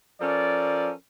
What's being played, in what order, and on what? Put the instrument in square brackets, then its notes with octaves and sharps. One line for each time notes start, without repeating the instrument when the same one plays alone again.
[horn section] F3 C#4 A4 A#4 D5